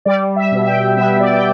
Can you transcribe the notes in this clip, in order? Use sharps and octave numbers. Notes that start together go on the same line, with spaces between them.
G3 D5
E5
B2
E5
G5
B3 E5
D5
G5